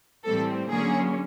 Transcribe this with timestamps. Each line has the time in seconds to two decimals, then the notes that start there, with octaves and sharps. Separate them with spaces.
0.25 A2 E3 G3 C4 A4
0.70 D3 F#3 A#3 C#4 G#4